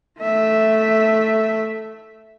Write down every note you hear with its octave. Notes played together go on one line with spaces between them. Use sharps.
A3 E5